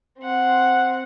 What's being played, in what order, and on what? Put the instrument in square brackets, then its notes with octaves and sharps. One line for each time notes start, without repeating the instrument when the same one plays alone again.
[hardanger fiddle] C4 F#5